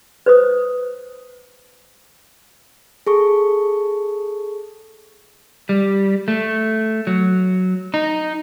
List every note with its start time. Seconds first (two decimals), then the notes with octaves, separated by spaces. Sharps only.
0.26 B4 C5 D#6
3.07 G#4 A4 C#6
5.69 G3
6.28 A3
7.07 F#3
7.94 D#4